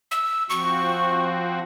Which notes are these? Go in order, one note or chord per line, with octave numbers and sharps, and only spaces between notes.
E6
F3 C4 F#4 C#6